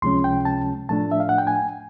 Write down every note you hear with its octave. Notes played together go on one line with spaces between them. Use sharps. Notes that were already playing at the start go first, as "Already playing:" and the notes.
C#2 C3 F3 G#3 C#4 C6
G5
A5
A2 F3 A3 D4 A5
E5
F5
F#5
G5
G#5